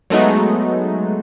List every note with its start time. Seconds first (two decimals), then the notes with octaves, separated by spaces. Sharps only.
0.10 F#3 G#3 A3 B3 D#4 F#4